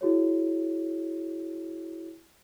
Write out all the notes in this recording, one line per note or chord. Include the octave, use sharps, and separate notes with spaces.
E4 F#4 G#4 C#5